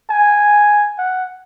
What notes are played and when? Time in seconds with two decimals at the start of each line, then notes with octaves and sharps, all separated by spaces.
0.10 G#5
0.98 F#5